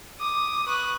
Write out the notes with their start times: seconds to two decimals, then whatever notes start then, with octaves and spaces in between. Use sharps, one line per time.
0.20 D6 D#6
0.66 B4 C#6 F#6